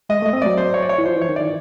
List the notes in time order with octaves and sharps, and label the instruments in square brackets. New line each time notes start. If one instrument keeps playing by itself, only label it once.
[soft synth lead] G#3 [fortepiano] D#5
[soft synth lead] A3
[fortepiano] D#5
[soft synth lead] C4
[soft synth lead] F#3 [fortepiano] D5
[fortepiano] C5
C#5
D5
C#5
[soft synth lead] E3
[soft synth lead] F3 [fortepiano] C5
[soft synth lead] E3
[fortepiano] C#5
[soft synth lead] D#3
[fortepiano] D5
[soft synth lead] D#3